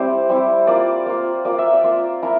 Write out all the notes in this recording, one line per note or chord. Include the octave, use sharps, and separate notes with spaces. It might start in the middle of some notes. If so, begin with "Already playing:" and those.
Already playing: G3 C4 E4 C5 D5
G3 C4 E4
A#3 F4 D5
A#3 F4
A#3 F4 D5
E5
D5
A#3 F4
A#3 E4 A#4